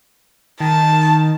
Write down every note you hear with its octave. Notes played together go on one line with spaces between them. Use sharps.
D#3 A5